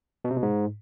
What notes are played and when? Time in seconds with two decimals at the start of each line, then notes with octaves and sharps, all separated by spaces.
0.24 B2
0.31 C3
0.37 B2
0.43 G#2